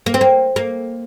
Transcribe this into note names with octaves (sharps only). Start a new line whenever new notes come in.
A#3
C4
A#3
A#3